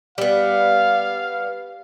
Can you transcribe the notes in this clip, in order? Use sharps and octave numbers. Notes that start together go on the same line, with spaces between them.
G3 B3 F5